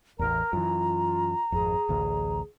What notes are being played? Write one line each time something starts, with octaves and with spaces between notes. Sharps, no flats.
A1 E2 A#4 A#5
F#2 E3 F4
G#1 F2 G#4
A1 D2